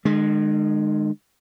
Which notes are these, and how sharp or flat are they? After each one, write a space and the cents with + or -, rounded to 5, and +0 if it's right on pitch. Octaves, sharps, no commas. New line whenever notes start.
D#3 -45 G#3 +0